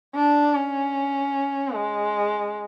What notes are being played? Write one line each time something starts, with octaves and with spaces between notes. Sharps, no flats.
D4
C#4
G#3